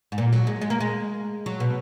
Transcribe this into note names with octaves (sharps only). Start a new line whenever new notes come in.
G#2
A#2
F#3
G#3
G#3
A#3
G#3
F#3
B2